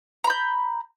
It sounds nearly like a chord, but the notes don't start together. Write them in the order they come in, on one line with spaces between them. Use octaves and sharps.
A#5 B5 G6